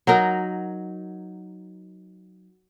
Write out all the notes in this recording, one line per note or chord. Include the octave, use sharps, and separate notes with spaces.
F#3 D#4 A#4